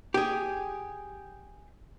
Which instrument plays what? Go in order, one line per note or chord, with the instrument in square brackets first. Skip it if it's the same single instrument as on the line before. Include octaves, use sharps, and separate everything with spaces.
[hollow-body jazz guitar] G4 G#4